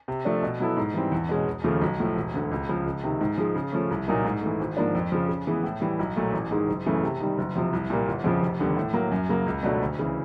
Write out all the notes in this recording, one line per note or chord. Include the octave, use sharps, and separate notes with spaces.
C3
F3 A3 D4
B2
F#3 B3 E4 A4
G#2
E3 G3 C4
E2
B2 G#3 C#4
E1
D#2 C#3 F3 A3
B1
A2 F3 A3
E1
D2 D3
C#2
C#3 F3
C#2
C3 D#3
G#2
F3 G#3
C#3
F3 A3 C#4
C2
A#2 F#3 A#3 D#4
G#2
E3 A3
G#1
G#2 F3 A#3 D4
F2
C#3 F3
C#3
E3 G#3 B3
A2
E3 G3
B1
A#2 F#3 A3
A1
G#2 D#3 G#3
F#1
F#2 C#3 E3 A3
C3
D#3 G3
F#1
F2 C3 F3
C2
A#2 G3 A#3
G1
F2 C#3 F3
F1
D#2 D3 G3 B3
A2
F#3 A#3
F#2
C#3 F#3 A#3
C#2
B2 F#3 A3 D4
D2
C#3 E3